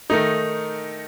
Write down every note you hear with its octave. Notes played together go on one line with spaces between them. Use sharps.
D#3 A3 D#4